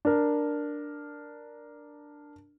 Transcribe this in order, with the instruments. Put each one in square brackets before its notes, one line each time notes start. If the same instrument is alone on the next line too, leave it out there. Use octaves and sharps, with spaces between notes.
[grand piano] D4 A#4